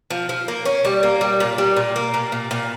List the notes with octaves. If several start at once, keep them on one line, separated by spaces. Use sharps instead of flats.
F3
F3
A#3
C#4
G3
A#3
G3
A#2
G3
A#2
A#3
A#2
A#2
A#2